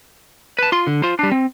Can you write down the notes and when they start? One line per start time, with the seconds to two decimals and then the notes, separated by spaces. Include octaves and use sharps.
0.59 B4 A5
0.72 F4 C6
0.87 D3
1.03 F4 C5
1.19 G3 D4
1.32 C4